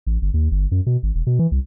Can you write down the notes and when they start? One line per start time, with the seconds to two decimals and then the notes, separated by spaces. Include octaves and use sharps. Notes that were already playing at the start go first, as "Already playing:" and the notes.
0.07 A1
0.22 G1
0.34 D#2
0.51 G1
0.72 F#2
0.86 B2
1.03 G#1
1.15 E1
1.27 B2
1.39 E3
1.52 C2